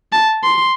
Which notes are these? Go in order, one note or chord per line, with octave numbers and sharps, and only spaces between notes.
A5
C6